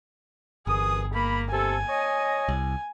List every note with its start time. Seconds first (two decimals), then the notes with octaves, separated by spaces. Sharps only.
0.67 G1 D#2 E3 G#4 D#6
1.14 A#3 B5
1.51 C3 C4 A4 G#5
1.89 C#5 D#5
2.48 C2